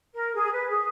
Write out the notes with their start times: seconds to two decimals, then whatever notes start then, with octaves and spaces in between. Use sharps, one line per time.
0.14 A#4
0.35 G#4
0.53 B4
0.69 G#4